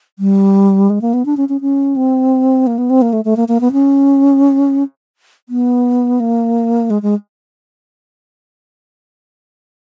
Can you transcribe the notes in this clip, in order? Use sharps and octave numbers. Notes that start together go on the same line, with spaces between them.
G3
G#3
A#3
B3
D4
C#4
C#4
C#4
C4
A#3
B3
C4
A#3
A3
A3
A#3
A#3
B3
C#4
B3
A#3
G#3
G#3